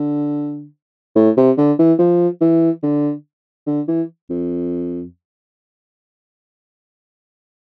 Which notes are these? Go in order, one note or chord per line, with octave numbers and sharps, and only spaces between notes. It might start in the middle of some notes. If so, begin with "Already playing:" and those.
Already playing: D3
A2
C3
D3
E3
F3
E3
D3
D3
E3
F2